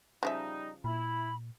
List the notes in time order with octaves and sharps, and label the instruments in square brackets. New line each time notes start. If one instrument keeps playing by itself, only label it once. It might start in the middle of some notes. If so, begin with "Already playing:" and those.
[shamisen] C#3 F3 E5 [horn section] G3 D#4
[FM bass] A#2 [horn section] E4 [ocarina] B5